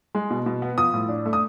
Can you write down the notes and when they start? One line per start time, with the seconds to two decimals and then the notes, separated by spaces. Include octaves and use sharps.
0.15 G#3
0.31 B2
0.46 B2
0.62 B3
0.77 F3 D#6
0.94 A2
1.09 D4
1.26 A3
1.33 D#6